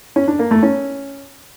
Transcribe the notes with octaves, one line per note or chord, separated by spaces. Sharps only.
C#4
D4
A#3
A3
C#4